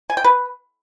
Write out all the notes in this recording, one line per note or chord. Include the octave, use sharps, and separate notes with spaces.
G#5
G5
B4